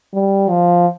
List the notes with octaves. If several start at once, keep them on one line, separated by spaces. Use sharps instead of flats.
G3
F3